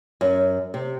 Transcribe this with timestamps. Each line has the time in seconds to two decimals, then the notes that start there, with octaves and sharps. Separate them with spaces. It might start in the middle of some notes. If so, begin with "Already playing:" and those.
0.21 F#2
0.74 C3